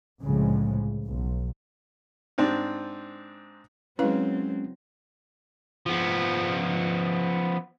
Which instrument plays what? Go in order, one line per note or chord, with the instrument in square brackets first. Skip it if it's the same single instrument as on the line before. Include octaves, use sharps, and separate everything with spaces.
[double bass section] C2 A2 C#3 F3 G#3
B1
[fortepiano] G#2 C4 D4
[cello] F#3 C4 [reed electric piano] G#3 C#4 [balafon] E4 B4 F5
[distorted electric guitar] F3 B3